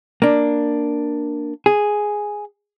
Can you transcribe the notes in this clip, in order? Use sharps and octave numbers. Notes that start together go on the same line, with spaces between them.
A#3 D4
G#4